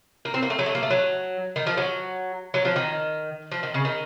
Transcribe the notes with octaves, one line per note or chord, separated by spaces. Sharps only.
A#3
C4
A#3
A3
F#3
A3
A#3
A3
F#3
D#3
F3
F#3
F#3
F3
D#3
F3
D#3
C#3
D#3